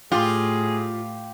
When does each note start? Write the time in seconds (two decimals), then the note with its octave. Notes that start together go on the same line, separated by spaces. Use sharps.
0.12 A2 F4 G4 G#4